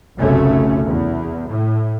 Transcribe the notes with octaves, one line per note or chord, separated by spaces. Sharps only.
F1 B1 F#2 C#3 A3 C#4
E2
A2